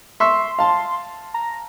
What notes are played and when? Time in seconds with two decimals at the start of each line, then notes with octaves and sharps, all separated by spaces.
0.20 E5 C6 C#6 E6
0.59 F5 A5
1.34 A#5